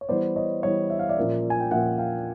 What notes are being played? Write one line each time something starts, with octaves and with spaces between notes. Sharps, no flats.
C#5
E3 G3 B3 C5 D5
C#5 D#5
E3 G3 B3 C#5 D#5
E5
F5
D5 E5
A#2 F3 A#3 C#4
G#5
G5
A#2 F3 A#3 C#4 E5 F#5
F5 G5